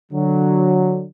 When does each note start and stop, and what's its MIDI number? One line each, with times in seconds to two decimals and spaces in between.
0.12 1.04 50
0.12 1.04 54